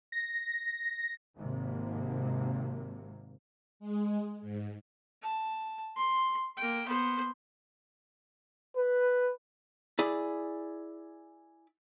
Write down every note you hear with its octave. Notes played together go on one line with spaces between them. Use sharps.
A#6
G#1 G#2 C3 A#3
G#3
G#2
A5
C6
A#3 G5
B3 C5
B4
E4 G#4 D5